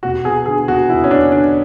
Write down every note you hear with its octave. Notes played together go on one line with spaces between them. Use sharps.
E1 F#4
E2 G#4
D3 G#4
E2 F#4
E2 E4
C#4
E2 D4
D3 D4